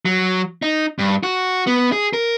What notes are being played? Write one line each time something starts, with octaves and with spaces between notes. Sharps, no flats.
F#3
D#4
G2
F#4
B3
G#4
A#4